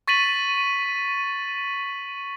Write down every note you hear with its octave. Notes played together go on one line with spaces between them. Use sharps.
C#6 A6 B6 D#7 F#7